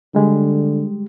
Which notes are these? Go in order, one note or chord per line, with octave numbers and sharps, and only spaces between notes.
D3 G3 G#3 G4